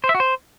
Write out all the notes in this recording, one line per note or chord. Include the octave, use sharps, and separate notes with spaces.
C5
E5
F#4
C5